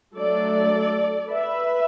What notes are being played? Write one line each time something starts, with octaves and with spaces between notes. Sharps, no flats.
F#3 A3 D4 A4 D5
B4 E5